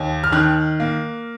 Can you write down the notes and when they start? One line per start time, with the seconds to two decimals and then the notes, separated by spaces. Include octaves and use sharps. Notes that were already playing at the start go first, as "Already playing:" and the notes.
Already playing: D#2
0.24 F6
0.32 D#3 F#6
0.80 A#3